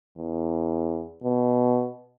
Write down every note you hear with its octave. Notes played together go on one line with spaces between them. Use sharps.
E2
B2